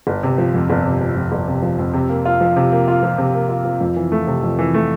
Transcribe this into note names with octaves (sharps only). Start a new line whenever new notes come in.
G1
C3
F3
F2
G1
C3
F3
F2
G1
C3
F3
F2
C3
A#3
F4
F3
C3
A#3
F4
F3
C3
A#3
F4
F3
F2
E3
A3
C3
F2
E3
A3